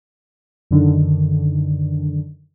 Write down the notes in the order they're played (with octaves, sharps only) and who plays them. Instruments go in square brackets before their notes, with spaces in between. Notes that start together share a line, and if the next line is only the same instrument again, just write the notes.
[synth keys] F#2 D3 D#3